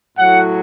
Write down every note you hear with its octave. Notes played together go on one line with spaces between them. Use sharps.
A2 F#3 F#5